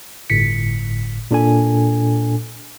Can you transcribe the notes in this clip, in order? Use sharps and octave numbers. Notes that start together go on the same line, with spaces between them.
G1 A2 B6 C#7
A#2 D4 A4 G#5